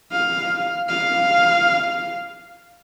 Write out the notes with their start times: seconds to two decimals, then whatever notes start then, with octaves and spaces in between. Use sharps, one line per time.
0.12 F5
0.89 F5